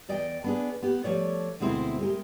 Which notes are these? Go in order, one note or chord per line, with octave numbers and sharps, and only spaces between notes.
E2 D5 D#5 G5
B3 D4 G#4
B3 G4
F3 A3 C#5 D5
D2 B2 G#3 C4 E4 C5
G#3 G4 A#4